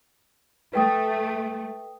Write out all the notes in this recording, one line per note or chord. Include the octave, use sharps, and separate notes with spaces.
A3 B4 G5 D#6